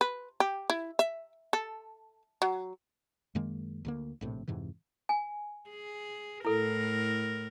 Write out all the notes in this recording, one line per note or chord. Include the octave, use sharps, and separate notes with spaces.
B4
G4
E4
E5
A4
F#3
F#2 D#3 G#3 A#3
D2 D3 A#3
A#1 A2 C3
F2 G#2 C3 E3
G#5
G#4
A2 E4 A4 A#4